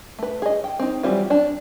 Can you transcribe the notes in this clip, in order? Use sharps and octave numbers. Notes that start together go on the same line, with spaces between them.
A3 B4
G#4 D#5
G5
C4 D#4
E3 F#3 G3 C4 F4
D4 A5